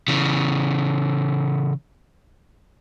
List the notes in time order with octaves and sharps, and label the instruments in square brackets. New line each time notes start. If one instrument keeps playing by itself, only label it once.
[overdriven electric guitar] C#3 E3